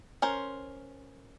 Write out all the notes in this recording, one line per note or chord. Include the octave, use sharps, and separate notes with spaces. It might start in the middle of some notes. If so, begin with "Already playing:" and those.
C#4 A#4 C5